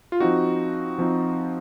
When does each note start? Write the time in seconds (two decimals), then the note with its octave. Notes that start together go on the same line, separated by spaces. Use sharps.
0.12 F4
0.20 F3 C4 D#4 F#4
0.98 F3 C4 D#4